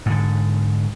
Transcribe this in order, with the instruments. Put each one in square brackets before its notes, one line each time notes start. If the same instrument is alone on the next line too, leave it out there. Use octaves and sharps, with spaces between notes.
[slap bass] G#2 D3